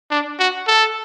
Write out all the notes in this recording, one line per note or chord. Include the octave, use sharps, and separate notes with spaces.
D4
F#4
A4